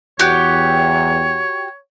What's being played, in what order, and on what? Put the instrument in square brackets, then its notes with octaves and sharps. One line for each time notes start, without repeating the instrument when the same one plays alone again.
[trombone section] E2 [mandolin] F#4 G4 [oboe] C#5